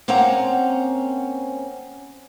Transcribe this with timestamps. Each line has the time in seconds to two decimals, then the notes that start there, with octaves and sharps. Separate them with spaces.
0.08 A#3 C4 C#4 F#5 A#5